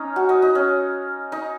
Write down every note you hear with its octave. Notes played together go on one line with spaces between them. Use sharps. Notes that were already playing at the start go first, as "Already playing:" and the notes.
Already playing: C#4 D#4
F#4
D#4
D#4
C#4
D#4